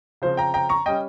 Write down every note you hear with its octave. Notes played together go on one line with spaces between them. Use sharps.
C#3 F3 C4 C5
G5 A#5
G5 A#5
A#5 C#6
G3 C#4 D#5 G5